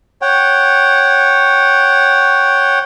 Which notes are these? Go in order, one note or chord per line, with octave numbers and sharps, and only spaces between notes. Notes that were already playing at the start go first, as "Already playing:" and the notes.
C#5 F#5 G5